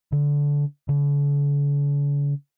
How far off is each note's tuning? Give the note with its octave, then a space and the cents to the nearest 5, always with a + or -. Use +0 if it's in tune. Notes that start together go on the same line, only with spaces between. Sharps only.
D3 -20
D3 -45